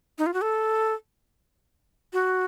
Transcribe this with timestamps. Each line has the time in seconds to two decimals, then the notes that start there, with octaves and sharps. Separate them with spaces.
0.18 D#4
0.26 F4
0.34 F#4
0.42 A4
2.13 F#4